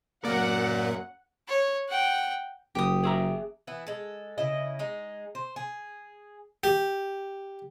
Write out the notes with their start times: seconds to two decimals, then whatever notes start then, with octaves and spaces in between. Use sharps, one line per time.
0.25 F#2 F#3 A#3 D5 F5 F#5
1.47 C#5
1.88 F#5 G5
2.75 F#1 G4 D#6
3.04 G#4 E5 A#5
3.67 E3 B3 E4
3.87 G#3 A4
4.38 C#3 E4 D#5
4.79 G#3 D#4
5.35 C5
5.56 G#4
6.64 G4